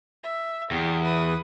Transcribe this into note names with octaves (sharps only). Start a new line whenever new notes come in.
E5
E2 G4
B4 D#6